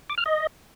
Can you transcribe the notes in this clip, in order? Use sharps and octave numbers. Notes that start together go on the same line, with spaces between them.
D6
F6
D#5